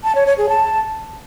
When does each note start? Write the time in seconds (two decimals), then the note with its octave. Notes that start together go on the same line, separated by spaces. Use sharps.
0.04 A5
0.15 C#5
0.26 C#5
0.38 G#4
0.49 A5